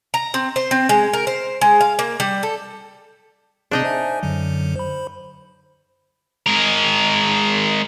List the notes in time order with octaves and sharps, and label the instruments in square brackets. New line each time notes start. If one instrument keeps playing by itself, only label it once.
[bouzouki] A#5
C4
C5
C4
G#3
A#4
C5
G#3
F5
A#3
G3
A4
[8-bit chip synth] C3 C4 G#4 [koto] D4 D#4 D#5
[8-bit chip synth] C5 E5 G#5
F#2 D3 F#3
C5 B5
[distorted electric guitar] G#3 A#4